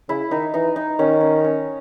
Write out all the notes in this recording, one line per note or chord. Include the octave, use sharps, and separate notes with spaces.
C#3 E4
D#3 D#4
E3 D#4
D#4
D#3 C#4
C#4
C#4